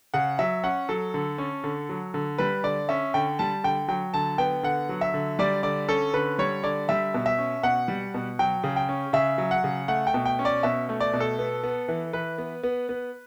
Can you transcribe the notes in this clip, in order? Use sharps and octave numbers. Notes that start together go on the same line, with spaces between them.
C#3 F#5
F#3 E5
C#4 F#5
F#3 A4
D3
C#4
D3
F#3
D3
G3 B4
D3 D5
C#4 E5
D3 G5
G3 A5
D3 G5
F#3 G5
D3 A5
B3 G5
D3 F#5
F#3
E5
D3
G3 D5
D3 D5
C#4 A4
D3 B4
G3 C#5
D3 D5
G3 E5
B2
E5
C#4
B2 F#5
G3
B2
F#3 G5
C#3
G5
C#4
C#3 E5
F#3
F#5
C#3
A3 F#5
G5
B2
G5
C#4
D5
B2 E5
A3
D5
B2
A4
B3
B3
E3
E3 B4
B3
B3
B3